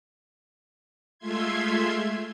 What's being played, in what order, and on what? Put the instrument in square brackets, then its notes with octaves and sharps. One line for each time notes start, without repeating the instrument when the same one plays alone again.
[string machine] G#3 A3 F4 E5 C6 G#6